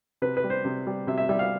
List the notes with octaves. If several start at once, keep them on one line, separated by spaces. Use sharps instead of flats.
C3 B4
B4
G3
C5
C3
G3
C3 E5
E5
G3 E5
F5